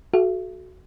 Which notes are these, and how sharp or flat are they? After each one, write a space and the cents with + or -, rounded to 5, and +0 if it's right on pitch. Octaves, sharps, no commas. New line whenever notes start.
F#4 +0 A4 -40 E5 +40